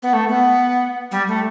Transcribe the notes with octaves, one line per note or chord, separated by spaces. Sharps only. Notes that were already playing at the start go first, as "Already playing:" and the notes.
B3
A3
B3
G3
A3